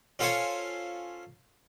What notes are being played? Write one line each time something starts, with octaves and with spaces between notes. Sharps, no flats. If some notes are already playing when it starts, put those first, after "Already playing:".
C#4 F4 A4 C5 C#5 G#5